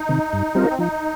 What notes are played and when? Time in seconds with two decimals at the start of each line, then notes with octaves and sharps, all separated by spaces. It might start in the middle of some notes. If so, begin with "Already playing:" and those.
Already playing: D#4
0.09 C3 D#3
0.33 G2
0.55 G3 C4 F4 A#4
0.70 C4
0.79 F3 D#4